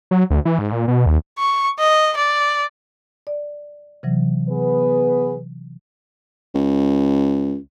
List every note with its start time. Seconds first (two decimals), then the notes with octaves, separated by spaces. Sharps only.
0.11 F#3
0.30 D2
0.45 E3
0.59 G#2
0.72 A#2
0.88 B2
1.06 D#2
1.39 C#6
1.79 D#5
2.16 D5
3.27 D5
4.03 C3 E3 F#3
4.49 B3 G#4 B4
6.55 C#2